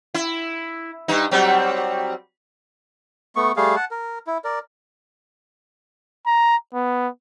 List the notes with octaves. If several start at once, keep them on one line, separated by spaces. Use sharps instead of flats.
E4
G2 D#4
F#3 G3 C4
A3 B3 C#6
G3 A3 G#4 F5
F#5 A5
A#4
E4
A#4 D5
A#5
B3